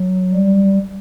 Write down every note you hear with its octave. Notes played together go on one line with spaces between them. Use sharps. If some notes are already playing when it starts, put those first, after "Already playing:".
Already playing: F#3
G3